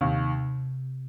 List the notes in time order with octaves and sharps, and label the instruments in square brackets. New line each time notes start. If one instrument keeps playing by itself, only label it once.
[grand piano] D#2 [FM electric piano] C3